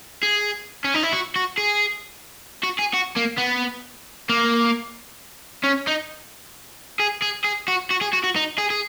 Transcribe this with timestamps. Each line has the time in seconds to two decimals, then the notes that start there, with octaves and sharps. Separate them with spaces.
0.23 G#4
0.84 C#4
0.94 D#4
1.03 E4
1.13 F#4
1.36 F#4
1.58 G#4
2.63 F#4
2.79 G#4
2.94 F#4
3.17 A#3
3.38 B3
4.29 A#3
5.64 C#4
5.87 D#4
7.00 G#4
7.22 G#4
7.44 G#4
7.68 F#4
7.90 F#4
8.01 G#4
8.13 F#4
8.23 F#4
8.36 D#4
8.58 G#4
8.70 G#4